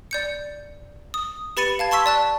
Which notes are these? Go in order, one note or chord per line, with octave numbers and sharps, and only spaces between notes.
D5 G6 C#7
D#6
G4 B4 B5 A6 C#7 D#7
F5 A5 G#6
A5 C6 C#6 E6 B6
D5 A5 F#6